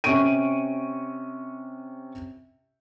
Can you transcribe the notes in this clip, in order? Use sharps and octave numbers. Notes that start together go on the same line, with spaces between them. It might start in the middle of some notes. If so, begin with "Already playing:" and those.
C3 C#4 C#6 D7 D#7